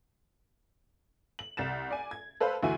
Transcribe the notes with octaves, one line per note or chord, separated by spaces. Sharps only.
F#7
C2 A6 E7
D5 G#5
G#6
A4 B4 C5 F5 B5
D2 E3 F#4 E5 G#5